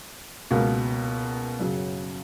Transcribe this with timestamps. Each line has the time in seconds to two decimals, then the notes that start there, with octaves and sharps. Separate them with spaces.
0.51 C#2 B2 A#3
1.59 F#2 C#3 F#3